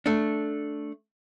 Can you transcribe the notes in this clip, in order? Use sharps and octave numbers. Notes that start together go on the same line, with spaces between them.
A3 D4